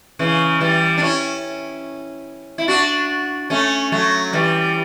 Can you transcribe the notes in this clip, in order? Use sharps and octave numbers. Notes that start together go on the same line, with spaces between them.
C#3 E3
E3 G3
D4
C#4 E4
E4
D4 F#4
A3 C#4
F#3 A3
E3 G3